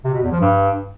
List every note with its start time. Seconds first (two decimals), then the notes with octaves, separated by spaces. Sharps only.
0.05 C3
0.14 B2
0.23 E2
0.32 F3
0.41 G2